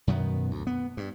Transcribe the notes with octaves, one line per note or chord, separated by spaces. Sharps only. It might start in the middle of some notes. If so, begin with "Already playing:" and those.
F#2 B2 D#3 B3
D2
B3
G2